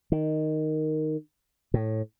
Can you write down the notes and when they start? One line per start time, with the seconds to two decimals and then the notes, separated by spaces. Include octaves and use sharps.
0.12 D#3
1.74 A2